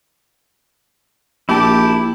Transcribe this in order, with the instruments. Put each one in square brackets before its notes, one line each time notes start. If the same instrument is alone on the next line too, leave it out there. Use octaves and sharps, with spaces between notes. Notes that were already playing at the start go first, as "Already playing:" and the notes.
[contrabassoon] A#1 [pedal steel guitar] E4 A5 [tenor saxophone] G4